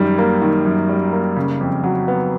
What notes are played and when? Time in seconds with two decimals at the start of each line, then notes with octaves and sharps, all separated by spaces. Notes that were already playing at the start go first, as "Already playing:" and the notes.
Already playing: F#2 D#3 G3
0.18 A#3
0.42 D#3
0.65 F#2
0.89 G3
1.12 A#3
1.36 C#3
1.61 F2
1.83 F#3
2.08 B3